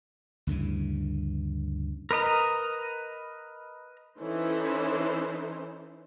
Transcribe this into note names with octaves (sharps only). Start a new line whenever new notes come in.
D2 G2 C#3 E3
A#4 B4 D#5 A#5
E3 C#4 D#4 A4 C5